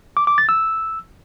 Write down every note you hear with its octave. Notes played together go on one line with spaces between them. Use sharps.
D6
D6
A6
E6